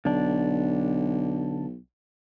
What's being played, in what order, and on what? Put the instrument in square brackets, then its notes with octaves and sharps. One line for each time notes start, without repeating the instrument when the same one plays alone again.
[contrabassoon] B1 [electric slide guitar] D3 D4